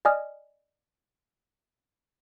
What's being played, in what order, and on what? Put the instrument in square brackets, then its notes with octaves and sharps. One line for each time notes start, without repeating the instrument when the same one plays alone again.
[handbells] D5 D#5 G#5 D#6 F6